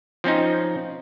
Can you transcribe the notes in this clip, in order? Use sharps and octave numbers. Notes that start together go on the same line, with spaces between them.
F3 C4 C#4 D#4